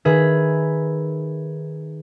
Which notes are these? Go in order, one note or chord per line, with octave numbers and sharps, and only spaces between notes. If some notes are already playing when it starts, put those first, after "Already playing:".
D#3 G#4 B4 E5